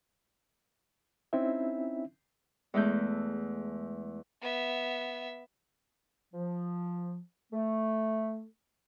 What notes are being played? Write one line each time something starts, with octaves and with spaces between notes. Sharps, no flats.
C4 C#4 D#4 E4 E5
E2 G#3 A3 G6
B3 E5
F3
A3